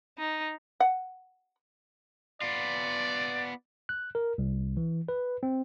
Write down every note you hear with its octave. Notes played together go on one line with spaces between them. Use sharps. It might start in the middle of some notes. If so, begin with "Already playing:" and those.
D#4
F#5
B3 F4 D5
F#6
A#4
C2
E3
B4
C4